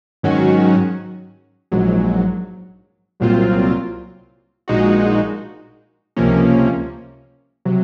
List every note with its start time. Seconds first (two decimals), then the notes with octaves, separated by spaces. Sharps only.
0.23 G#2 D#3 F#3 C#4 F#4
1.72 A#1 G#2 F#3
3.20 C2 A#2 F#3 C4 F4
4.68 A#1 A#2 G#3 D#4 F#4
6.16 C#2 C3 F3 A#3 C#4
7.65 C3 F#3